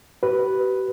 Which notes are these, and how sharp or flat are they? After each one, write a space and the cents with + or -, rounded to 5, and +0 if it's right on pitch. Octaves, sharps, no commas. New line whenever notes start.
G4 -45 B4 +0